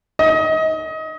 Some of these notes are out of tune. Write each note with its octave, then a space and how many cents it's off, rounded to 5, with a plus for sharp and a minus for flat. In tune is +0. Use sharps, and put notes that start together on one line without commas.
D#5 +30